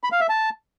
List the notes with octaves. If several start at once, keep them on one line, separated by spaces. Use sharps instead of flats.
B5
F5
E5
A5